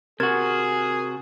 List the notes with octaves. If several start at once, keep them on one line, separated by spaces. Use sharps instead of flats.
C3 F#4 G#4 A#4 G#6 A6